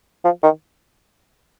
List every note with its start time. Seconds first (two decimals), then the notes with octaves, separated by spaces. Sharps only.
0.24 F3
0.43 D#3